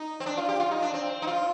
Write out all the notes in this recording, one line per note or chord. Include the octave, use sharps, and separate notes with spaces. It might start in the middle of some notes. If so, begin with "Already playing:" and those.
Already playing: D#4
C4
D4
F4
G4
F4
D#4
D4
C4
D#4
F4